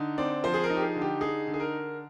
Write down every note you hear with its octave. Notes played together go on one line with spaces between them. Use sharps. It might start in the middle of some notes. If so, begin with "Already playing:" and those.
Already playing: D3 D#4
C4 D5
F3 C5
G#4
A#4
D#4
G4
G#4
D3
G4
D#4 G#4
D3
G#4
A#4